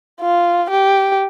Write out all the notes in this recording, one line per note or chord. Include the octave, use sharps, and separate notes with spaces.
F4
G4